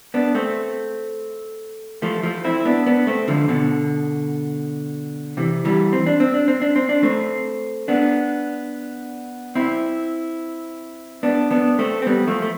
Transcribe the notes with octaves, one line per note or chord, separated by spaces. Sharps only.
B3 D4
A3 C4
F3 A3
F3 A3
C4 E4
B3 D4
B3 D4
A3 C4
D3 F3
B2 D3
C3 E3
E3 G3
C4
D4
C4
D4
C4
D4
C4
D4
A3 C4
B3 D4
C4 E4
B3 D4
B3 D4
A3 C4
C4
G3 B3
F3 A3
A3